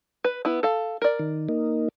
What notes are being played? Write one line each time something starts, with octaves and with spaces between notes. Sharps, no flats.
B4
B3 E4
A4 F5
A#4 D5
D#3
A#3 D#4